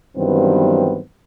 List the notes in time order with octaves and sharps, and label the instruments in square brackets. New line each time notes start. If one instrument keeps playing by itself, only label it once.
[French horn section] G2 D#3 E3 F#3 B3 C4